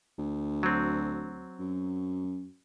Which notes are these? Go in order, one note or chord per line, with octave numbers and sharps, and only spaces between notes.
D2
F#3 C4
F#2